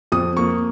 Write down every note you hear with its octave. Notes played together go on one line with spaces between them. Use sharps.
F2 D#6
A#3 C#6